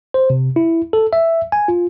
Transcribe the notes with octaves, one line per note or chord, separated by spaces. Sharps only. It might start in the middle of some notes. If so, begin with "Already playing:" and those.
C5
C3
E4
A4
E5
G#5
F4